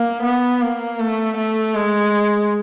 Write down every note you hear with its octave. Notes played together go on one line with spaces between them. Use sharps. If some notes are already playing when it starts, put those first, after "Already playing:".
Already playing: A#3
B3
A#3
A3
A3
G#3